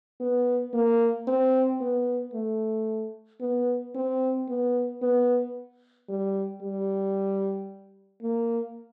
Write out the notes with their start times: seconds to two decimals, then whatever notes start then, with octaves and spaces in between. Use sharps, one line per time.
0.21 B3
0.74 A#3
1.27 C4
1.81 B3
2.34 A3
3.41 B3
3.95 C4
4.49 B3
5.02 B3
6.09 G3
6.62 G3
8.22 A#3